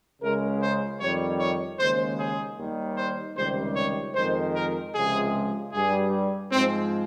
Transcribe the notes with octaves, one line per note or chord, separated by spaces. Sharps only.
C#2 C#3 G#3 A#4
C5
F2 D#3 G3 C#5
C#5
D#2 C#3 G#3 C5
G#4
D#2 D#3 G3
C5
C#2 C3 D#3 G3 C5
C#5
F2 D#3 G#3 C5
A#4
C#2 C3 F3 G#3 G#4
G2 G3 G#4
G#2 F3 G#3 C4